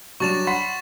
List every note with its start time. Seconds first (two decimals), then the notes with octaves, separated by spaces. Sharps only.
0.20 F#3 G3 D4 C#6 A6 E7
0.47 F#5 B5 C6 B6